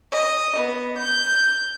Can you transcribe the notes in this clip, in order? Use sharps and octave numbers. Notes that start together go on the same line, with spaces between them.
D#5
B3
G6